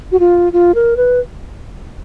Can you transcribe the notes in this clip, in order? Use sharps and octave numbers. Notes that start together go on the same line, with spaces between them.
F#4
F4
F4
A#4
B4